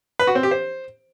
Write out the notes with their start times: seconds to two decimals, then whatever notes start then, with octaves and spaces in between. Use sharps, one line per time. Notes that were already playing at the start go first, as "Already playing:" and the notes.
0.19 B4
0.27 F#4
0.35 C4
0.43 G4
0.51 C5